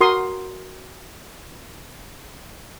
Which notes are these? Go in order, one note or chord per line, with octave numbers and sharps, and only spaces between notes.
F#4 A#4 C6 D#6